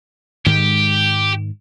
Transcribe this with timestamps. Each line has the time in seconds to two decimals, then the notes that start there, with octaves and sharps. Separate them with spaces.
0.46 G#2 D#3 G#3 G4